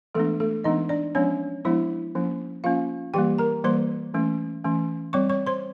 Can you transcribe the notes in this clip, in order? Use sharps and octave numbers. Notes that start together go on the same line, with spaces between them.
E3 G#3 A3 B3 D4 A4
A3 A4
E3 G#3 B3 D4 D#4 D#5
D4 D5
F3 G#3 B3 C#4 D4 C#5
F3 G#3 B3 D4 E4 E5
F3 A#3 C#4
F3 A#3 C#4 F4 F5
E3 G3 A#3 G4 G5
A#4 A#5
E3 G3 A#3 C5 C6
E3 A3 C#4
E3 A3 C#4
G3 C4 C#5 C#6
C#5 C#6
C5 C6